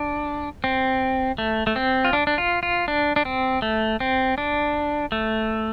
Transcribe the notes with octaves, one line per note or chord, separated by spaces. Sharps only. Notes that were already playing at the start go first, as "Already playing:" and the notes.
Already playing: D4
C4
A3
A3
C4
F4
D4
D4
F4
F4
D4
D4
C4
A3
C4
D4
A3